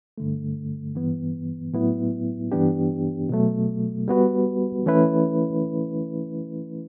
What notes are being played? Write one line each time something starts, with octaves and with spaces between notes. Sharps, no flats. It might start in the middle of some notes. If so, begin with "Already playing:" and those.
G2 D3 A3
G2 E3 B3
A2 F#3 B3 E4
G2 E3 B3 D4 G4
B2 F#3 A3
G3 B3 F#4 B4
E3 A3 C#4 E4 B4